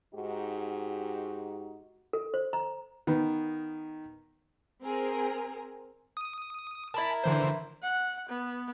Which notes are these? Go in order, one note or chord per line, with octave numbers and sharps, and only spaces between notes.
G#2 D#4 F#4 G4
A4
C5
A#5
D#3 B3
C4 G#4 A#4
D#6
E4 A#4 A5 B5
D3 E3 C5
F#5
B3